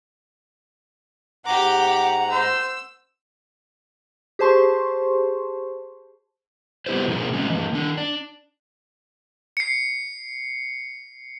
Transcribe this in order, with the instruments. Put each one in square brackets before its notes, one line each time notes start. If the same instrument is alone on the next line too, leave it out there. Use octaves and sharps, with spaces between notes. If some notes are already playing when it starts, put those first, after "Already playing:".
[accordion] G#2 A#5 [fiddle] G4 D6 [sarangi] F#5
[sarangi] C5 [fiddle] E6
[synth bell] G4 G#4 C5 A5 C6 C#6
[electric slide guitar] B3 E4 G4 A4 B4 C5
B2 F3 A#3 G#4
G#3 A3 C#4
E3 A#3
D#3 D4
D4
[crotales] C7 C#7